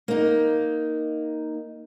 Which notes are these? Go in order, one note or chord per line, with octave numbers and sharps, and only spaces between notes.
A#3 D#4